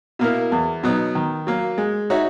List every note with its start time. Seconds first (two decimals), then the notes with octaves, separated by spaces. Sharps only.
0.19 B2 A#3 E4 A#4
0.52 E2
0.83 B2 F#3 B3 D#4
1.15 D#3
1.47 F#3 A#3
1.78 G#3
2.10 D#4 F#4 C#5 E5